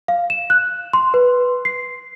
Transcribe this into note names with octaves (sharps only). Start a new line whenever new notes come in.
F5
E7
F#6
C6
B4
C7